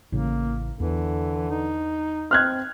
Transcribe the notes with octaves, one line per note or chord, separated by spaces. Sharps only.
A1 A2 C#3 A#3
E2 D3 E3
D#4
C4 F6 F#6 G#6